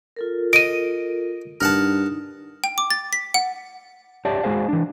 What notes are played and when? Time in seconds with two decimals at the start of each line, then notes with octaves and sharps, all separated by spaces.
0.16 F4 A4 A#4
0.53 D#5 D7 D#7
1.61 G2 D#4 A#4 F#5 A5
2.64 G5
2.78 D6
2.90 A6
3.13 B6
3.34 F#5
4.25 G4 C#5 D5 E5 A5
4.43 G#3 F#4 G#4 C5 F5
4.69 E3 D4